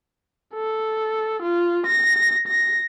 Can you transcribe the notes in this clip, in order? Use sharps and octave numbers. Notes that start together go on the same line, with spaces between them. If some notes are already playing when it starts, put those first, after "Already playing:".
A4
F4
A#6
A#6